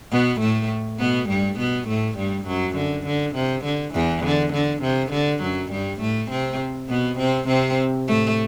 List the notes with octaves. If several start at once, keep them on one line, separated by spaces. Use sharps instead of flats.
B2 B3
A2 A3
B2 B3
G2 G3
B2 B3
A2 A3
G2 G3
F#2 F#3
D3
D3
C3
D3
E2 E3
D3
D3
C3
D3
F#2 F#3
G2 G3
A2 A3
C3 C4
B2 B3
C3 C4
C3 C4
A2 A3